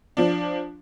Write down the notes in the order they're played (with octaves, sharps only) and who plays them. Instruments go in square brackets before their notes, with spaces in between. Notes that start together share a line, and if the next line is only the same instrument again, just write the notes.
[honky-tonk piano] F3 D4